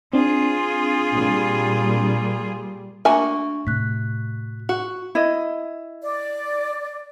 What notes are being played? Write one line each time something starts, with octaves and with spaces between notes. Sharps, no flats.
C4 D4 F4 G#4
A#2 G3
A3 A#3 D4 F#4 A#4 E5 G#5
A2 C3 F#6 B6
F#4
E4 D#5
D5